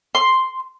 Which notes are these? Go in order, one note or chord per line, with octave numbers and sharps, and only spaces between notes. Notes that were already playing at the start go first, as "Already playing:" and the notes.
C6